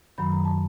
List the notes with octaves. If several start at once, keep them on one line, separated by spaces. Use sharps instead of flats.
F#2 D#3 F#3 B5
A#5
A5